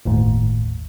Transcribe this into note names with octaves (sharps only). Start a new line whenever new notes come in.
G1 D#2 A2